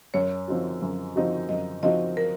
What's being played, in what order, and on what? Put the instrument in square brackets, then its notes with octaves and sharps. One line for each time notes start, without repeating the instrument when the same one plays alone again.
[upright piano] F#2 [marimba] C#5
[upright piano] F3 C4 D#4 F#4
F#2
F3 C4 D#4 F#4
[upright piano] F#2 [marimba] D#5
[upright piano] F3 C4 D#4 F#4 [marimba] D#5
[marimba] A#4